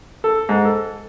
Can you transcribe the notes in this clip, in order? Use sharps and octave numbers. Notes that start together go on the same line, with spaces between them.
A4
G#2
A4